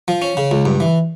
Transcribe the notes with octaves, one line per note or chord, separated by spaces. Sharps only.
F3
C#4
C#3
C#2
G2
E3